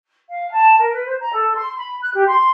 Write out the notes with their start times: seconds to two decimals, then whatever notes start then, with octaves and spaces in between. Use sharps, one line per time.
0.30 F5
0.51 A5
0.78 A#4
0.93 B4
1.06 C5
1.20 A#5
1.32 A4
1.55 C6
1.77 B5
2.01 F#6
2.14 G4
2.26 C6